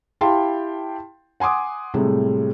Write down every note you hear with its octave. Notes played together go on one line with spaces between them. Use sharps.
E4 G4 F5 G5 A5 C6
F#5 G#5 C6 D6 D#6
A2 C3 G3 G#3